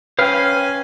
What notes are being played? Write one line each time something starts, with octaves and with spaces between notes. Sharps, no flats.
C#4 B4 C5 F5 G5 G#5 F6